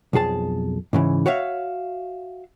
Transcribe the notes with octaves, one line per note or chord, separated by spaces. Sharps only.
B1 F2 G#4 A5
G#2 C#3 E3
F#4 C#5 E5 F5